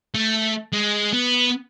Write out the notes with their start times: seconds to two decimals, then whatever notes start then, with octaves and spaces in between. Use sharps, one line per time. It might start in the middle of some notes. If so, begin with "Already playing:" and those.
0.14 A3
0.73 G#3
1.13 B3